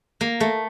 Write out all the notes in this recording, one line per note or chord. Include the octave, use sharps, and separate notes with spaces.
A#3
A3